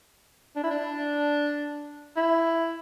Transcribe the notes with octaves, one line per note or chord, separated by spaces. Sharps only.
D4
E4
D4
E4